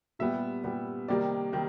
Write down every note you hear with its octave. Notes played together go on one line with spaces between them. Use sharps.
A#2 G3 B3 E5
A#2 G3 B3
C3 D#3 G3 A#3 D5
C3 D#3 G3